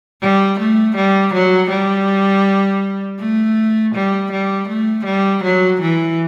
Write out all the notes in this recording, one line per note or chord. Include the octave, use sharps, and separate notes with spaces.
G3
A3
G3
F#3
G3
A3
G3
G3
A3
G3
F#3
E3